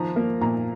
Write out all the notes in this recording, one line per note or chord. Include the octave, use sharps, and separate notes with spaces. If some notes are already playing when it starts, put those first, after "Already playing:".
Already playing: D#3 F3 A#5
A#3
A#2 A#5